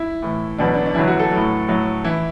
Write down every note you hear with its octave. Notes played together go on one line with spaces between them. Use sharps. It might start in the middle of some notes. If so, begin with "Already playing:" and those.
Already playing: E4
A2 E3
E2 B2 F#3 D4
D4
D4
E2 D3 F#3 E4
F#4
A4
A2 F#3
A2 F#3
E3 E4